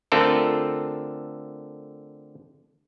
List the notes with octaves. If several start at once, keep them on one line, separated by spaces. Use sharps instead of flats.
D3 A3 C4 F4 A4 A#4